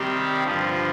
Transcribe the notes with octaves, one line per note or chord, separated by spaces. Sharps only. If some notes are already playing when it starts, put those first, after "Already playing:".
Already playing: C3 D#3 G3 C4 G4
G2 D3 F3